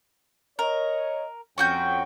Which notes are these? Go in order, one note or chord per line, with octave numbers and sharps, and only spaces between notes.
A#4 C#5 D#5
F2 C#4 F#4 G5 G6